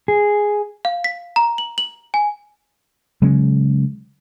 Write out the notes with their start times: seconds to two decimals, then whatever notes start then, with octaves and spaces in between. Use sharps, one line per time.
0.08 G#4
0.85 F5
1.04 B6
1.36 A#5
1.58 F#7
1.78 F#7
2.14 G#5
3.22 C#3 F#3 G#3 C#4